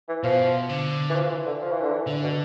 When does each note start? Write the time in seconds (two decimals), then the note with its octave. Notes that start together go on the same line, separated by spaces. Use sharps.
0.09 E3
0.23 B2 F3
0.70 D3
1.10 E3
1.16 F3
1.31 E3
1.46 D3
1.62 F3
1.72 E3
1.82 D3
1.92 E3
2.07 D3
2.24 B2